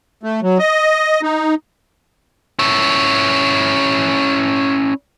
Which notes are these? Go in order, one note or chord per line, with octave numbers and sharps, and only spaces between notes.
A3
F#3
D#5
D#4
C#4 E4